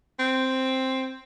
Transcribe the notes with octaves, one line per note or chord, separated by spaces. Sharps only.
C4